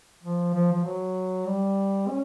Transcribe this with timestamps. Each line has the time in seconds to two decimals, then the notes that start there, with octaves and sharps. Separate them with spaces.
0.24 F3
0.54 F3
0.73 F3
0.85 F#3
1.46 G3
2.08 C#4